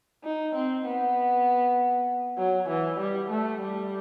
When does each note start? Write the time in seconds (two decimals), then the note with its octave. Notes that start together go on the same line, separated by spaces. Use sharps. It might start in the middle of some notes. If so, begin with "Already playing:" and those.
0.24 D#4
0.55 C4
0.86 B3
2.38 F#3
2.69 E3
3.00 G3
3.30 A3
3.61 G3